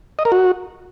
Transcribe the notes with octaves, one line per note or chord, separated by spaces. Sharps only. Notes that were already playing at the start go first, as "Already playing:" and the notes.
D#5
A#4
F#4